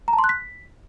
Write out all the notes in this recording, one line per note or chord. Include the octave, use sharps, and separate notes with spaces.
A#5
A5
C6
F#6
B6